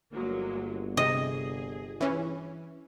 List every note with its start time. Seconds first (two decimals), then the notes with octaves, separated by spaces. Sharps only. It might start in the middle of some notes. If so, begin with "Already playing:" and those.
0.12 G1 F#3 G#3 A#3
0.97 C3 G#4 D#5
2.00 E3 C#4